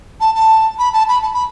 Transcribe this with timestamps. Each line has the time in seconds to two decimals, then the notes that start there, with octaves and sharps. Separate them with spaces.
0.20 A5
0.35 A5
0.78 B5
0.93 A5
1.08 B5
1.22 A5
1.33 B5